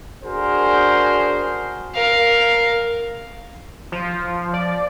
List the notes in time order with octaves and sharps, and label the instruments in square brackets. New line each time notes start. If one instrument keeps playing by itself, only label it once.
[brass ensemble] D4 F#4 G#4 A#4 C5
[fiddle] A#4 F5
[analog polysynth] F3
D5